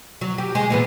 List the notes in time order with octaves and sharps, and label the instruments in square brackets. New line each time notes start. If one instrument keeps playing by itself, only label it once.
[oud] F#3
G4
G#3
A#2 E3 B3